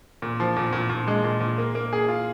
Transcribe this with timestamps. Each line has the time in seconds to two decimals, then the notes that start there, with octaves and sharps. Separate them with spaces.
0.22 A#2
0.40 F3
0.56 A#2
0.73 A#2
0.90 A#2
1.08 G#3
1.24 A#2
1.40 A#2
1.58 A#3
1.75 A#3
1.93 G#4
2.08 F4